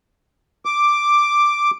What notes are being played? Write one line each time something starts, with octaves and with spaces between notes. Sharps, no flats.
D6